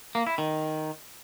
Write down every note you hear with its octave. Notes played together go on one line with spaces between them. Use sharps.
A#3
E4
D#3